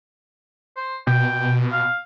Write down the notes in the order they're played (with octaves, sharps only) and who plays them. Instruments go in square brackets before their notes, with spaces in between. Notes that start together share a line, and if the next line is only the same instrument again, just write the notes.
[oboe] C5
[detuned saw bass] B2 [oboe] G5
[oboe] F5